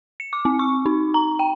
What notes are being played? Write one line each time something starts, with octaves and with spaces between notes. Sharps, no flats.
C#7
D6
C4
C#6
D#4
A#5
G5